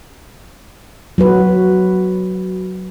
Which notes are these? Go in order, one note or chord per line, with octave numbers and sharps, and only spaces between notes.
F#3 F#4 B4